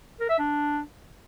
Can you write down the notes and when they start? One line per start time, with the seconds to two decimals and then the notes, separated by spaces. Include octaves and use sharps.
0.20 A#4
0.29 E5
0.39 D4